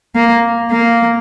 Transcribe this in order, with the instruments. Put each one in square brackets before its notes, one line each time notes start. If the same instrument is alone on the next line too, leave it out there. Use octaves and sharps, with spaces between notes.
[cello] A#3
A#3